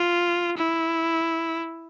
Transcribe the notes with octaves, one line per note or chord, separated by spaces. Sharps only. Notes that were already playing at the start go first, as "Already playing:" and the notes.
Already playing: F4
E4